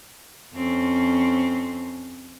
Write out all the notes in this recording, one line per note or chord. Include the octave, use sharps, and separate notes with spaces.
F2 C4 C#4